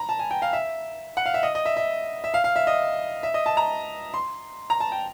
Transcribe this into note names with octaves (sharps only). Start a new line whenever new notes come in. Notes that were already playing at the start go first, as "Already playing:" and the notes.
Already playing: A#5 B5
A5
G#5
G5
F5
E5
F#5
F5
E5
D#5
D#5
E5
E5
E5
F5
F5
E5
D#5
E5
D#5
A5
A#5
C6
A#5
A5
G5